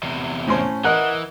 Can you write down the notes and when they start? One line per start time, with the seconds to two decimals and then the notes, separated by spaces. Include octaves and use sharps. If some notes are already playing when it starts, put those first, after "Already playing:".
0.03 E2 C3
0.47 A2 C#4 C5
0.84 E3 A#4 D#5 F#5 F#6